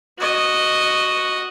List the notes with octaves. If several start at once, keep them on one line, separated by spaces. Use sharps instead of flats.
F#4 D#5